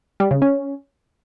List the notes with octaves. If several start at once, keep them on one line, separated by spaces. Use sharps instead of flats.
G3
C#3
C#4